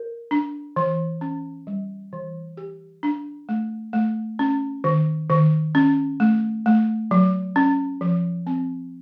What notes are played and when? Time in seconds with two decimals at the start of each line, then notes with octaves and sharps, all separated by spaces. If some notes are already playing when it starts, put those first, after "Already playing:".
Already playing: A#4
0.31 D4
0.76 E3
1.21 C#4
1.67 G3
2.13 E3
2.57 G4
3.03 D4
3.49 A3
3.93 A3
4.39 C#4
4.84 D#3
5.30 D#3
5.75 C#4
6.20 A3
6.66 A3
7.11 F#3
7.56 C#4
8.01 F3
8.47 C4